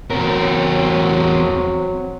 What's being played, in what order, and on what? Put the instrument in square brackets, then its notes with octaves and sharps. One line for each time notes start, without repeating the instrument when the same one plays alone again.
[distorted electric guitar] E2 A#4 [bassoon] F#3 [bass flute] C4